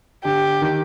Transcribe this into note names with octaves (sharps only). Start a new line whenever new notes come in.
D3 G4
D#3